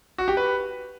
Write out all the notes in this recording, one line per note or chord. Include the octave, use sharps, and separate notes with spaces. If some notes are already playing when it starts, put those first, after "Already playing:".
F#4
G4
B4